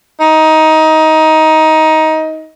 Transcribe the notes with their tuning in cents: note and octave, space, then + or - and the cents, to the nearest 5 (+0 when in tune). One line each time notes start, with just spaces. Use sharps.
D#4 +15